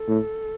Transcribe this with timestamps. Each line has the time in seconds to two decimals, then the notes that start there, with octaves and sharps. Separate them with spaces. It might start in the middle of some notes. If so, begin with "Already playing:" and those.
Already playing: A4
0.08 A2